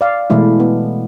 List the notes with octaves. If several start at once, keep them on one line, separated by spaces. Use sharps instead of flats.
D5 F5
B2 E3 G#3 A3 E4
B3